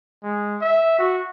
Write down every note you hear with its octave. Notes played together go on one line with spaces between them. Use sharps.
G#3
E5
F#4